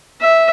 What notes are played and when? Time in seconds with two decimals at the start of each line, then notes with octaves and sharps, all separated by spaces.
0.21 E5